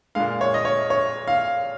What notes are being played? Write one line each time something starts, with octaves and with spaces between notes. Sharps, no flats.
A#2 G#3 F5
C#5
D#5
C#5
C#5
F5